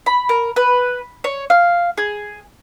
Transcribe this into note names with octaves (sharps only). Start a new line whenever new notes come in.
B5
A#4
B4
C#5
F5
G#4